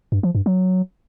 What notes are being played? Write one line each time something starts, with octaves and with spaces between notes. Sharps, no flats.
G2
F3
G2
F#3